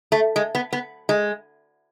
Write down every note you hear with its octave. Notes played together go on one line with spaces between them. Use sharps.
A3
G#3
B3
B3
G#3